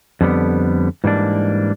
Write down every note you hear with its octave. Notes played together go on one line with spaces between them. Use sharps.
F2 D3 G3 B3
G#2 E3 G3 A#3 D4